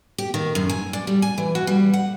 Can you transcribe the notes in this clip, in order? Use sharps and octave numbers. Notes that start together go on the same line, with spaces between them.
G4
D#3
F#2
G#5
D5
G3
G#5
E3
F#4
G3
F#5